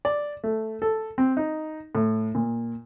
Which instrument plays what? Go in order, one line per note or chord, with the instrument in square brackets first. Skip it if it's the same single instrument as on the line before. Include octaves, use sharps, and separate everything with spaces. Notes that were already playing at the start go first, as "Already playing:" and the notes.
[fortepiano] D5
A3
A4
C4
D#4
A2
A#2